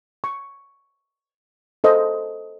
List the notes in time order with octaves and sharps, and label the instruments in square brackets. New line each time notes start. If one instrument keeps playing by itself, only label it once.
[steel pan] C#6
A4 C5 D#5